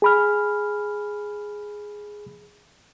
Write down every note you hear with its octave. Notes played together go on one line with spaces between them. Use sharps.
G#4 B5 F6